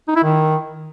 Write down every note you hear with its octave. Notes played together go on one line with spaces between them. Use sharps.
D#4
E4
D#3